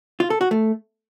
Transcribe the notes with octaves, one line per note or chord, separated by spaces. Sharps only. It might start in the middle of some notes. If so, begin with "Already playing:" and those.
F4
A4
F#4
A3